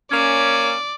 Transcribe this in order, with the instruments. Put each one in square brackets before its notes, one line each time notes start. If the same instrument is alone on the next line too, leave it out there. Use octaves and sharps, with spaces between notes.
[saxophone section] A#3 C#4 [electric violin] D5